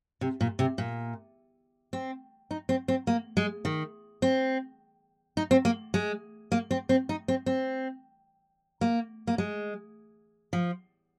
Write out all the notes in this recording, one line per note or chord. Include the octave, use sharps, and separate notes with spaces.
C3
A#2
C3
A#2
C4
D#4
C4
C4
A#3
G#3
D#3
C4
D#4
C4
A#3
G#3
A#3
C4
C4
D#4
C4
C4
A#3
A#3
G#3
F3